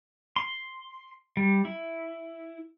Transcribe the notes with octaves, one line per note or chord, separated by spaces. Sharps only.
C6
G3
E4